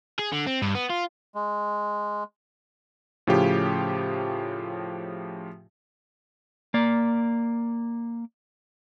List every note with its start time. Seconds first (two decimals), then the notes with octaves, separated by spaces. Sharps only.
0.19 G#4
0.32 D3
0.47 C4
0.62 G2
0.75 B3
0.90 F4
1.35 G#3
3.27 A2 C#3 F3 F4 G4
6.74 A#3 D5